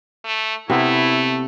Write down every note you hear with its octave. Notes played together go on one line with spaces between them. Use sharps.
A3
C3 A3 B3 E4